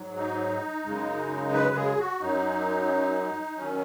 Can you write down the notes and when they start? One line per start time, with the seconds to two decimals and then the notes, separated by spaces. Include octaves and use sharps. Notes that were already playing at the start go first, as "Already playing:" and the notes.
Already playing: G#2 F#3
0.16 D#4
0.85 F#2 C#3 G#3
1.53 B4
1.75 G#4
1.98 F#4
2.20 F#2 F#3 D#4
3.57 D#3 F#3 C#4